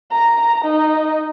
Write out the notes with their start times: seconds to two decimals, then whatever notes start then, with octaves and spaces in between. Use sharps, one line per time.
0.11 A#5
0.64 D#4